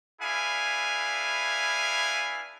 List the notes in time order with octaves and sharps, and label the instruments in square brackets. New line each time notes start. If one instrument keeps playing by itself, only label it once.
[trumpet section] D4 E4 G#4 B4 F5 G#5